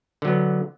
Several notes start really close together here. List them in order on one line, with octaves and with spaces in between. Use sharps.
D3 F#3 B3